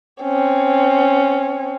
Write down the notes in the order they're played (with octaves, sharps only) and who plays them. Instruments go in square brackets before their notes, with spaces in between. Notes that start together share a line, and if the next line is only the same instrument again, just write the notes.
[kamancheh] C4 C#4